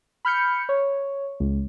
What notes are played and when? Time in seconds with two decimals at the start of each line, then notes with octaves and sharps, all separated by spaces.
0.25 B5 F6 G6 C#7
0.69 C#5
1.40 C#2